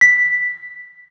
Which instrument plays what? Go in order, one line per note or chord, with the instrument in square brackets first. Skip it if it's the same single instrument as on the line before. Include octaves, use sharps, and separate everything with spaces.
[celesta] B6